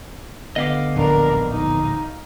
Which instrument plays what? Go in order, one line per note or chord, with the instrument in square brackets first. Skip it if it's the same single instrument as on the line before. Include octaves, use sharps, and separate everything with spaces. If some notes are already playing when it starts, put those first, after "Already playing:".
[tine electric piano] D3 B3 B6 [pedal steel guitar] D#5 F5 D6
[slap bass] D1 A#1 [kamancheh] D4 A#4
[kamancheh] D#4